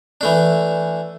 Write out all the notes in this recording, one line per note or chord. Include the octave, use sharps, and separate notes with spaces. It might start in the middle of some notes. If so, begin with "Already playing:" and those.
E3 A3 D4